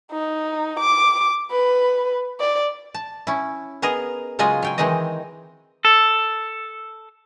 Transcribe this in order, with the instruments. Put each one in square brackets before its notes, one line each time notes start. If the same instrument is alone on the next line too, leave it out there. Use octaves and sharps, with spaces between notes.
[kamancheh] D#4
D6
B4
D5
[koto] A5
C#4 E4
B3 G#4 A#4 D#5
C#3 F#3 G#3 F4 D#5 G#5
F#3 G5 G#5
D#3 E3 G#3 C4 D#4 D#5
[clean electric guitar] A4